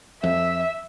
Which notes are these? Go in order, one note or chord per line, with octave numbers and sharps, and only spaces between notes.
F2 E5